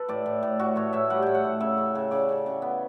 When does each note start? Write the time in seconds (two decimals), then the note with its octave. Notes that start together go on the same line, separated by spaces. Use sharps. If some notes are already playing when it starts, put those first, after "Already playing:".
Already playing: A4 B4
0.09 A2 D5
0.26 A2
0.43 A2
0.59 A2 F#4
0.76 A2 C#5
0.93 A2 E5
1.10 G3 F#5
1.22 A2 G5
1.35 F#5
1.44 A2
1.60 C#3 E5
1.77 C#3
1.95 C#3
2.11 C#3 D5
2.29 C#3
2.46 C#3
2.62 B3